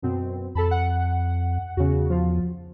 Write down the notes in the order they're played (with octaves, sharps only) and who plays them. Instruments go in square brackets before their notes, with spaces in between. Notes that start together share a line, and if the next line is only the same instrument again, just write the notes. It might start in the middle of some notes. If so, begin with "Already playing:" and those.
[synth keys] F#2 B2 C4
[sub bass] F2 [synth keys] A4 A5 B5
[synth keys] F#5
[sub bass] E2 [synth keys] C#3 F#4
[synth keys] F3 F4